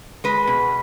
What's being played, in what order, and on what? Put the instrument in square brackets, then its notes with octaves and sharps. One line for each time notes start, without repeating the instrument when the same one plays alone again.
[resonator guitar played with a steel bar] G#3 B4
B2